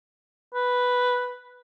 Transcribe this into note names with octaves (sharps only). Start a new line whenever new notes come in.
B4